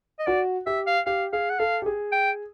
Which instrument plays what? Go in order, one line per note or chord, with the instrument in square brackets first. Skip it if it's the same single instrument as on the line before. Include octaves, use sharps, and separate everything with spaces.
[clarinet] D#5
[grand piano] F#4 [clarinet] D5
[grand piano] G4 [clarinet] E5
[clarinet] F5
[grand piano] G4 [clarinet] F5
[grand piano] G#4 [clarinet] F5
[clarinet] F#5
[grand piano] A4 [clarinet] F5
[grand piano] G4
G#4
[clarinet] G5